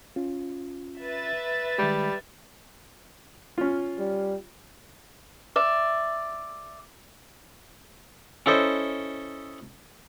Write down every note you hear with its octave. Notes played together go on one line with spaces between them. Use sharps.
C#4 F4
B4 E5 A6
D#3 G3 G#3
C#4 F4
G3
D5 E5
C#4 E4 A4 C5 D#5